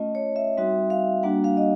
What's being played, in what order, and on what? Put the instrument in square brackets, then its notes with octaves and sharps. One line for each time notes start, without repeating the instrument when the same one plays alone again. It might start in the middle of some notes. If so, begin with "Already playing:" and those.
Already playing: [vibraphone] A3 C#4 F4 D#5
C#5
E5
G3 C4 D#4 F#4 E5
F5
G3 A#3 D4 F#4 F#5
F5
D#5